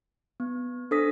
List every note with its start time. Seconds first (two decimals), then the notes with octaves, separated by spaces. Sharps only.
0.40 B3
0.91 D4 A4 C5 D#6 A#6 B6